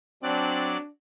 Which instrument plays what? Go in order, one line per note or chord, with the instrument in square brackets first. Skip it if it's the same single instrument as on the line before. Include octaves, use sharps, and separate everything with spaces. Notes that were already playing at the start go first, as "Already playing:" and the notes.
[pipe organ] F#3 D5 F#6 [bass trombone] C4 [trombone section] D4